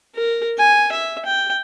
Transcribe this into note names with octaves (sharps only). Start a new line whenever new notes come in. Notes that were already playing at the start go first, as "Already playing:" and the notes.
A#4
G#5
E5
G5